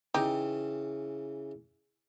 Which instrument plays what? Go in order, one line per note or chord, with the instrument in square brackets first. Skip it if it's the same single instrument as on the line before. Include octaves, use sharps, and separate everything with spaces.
[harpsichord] C#3 E3 [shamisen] D#4 G4